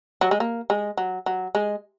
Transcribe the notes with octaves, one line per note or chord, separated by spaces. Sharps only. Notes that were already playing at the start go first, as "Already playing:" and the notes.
F#3
G#3
A#3
G#3
F#3
F#3
G#3